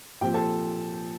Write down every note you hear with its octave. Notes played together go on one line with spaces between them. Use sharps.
A#2 F3 C4 G4 G5
A4 A5